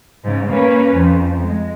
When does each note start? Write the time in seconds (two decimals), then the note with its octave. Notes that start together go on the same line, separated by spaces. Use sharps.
0.24 G#2 C#3
0.53 A#3 C#4 B4
0.95 F2
1.45 G#3